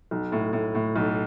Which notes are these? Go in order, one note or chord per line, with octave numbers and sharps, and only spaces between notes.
B1
A2
A2
A2
B1